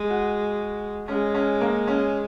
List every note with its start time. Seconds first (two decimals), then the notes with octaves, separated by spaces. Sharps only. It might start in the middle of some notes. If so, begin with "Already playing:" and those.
Already playing: G#3
0.10 F#4
1.08 G#3 C#4
1.34 C#4
1.61 A#3
1.87 C#4